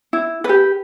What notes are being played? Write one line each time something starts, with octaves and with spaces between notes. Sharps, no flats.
E4
G4 B4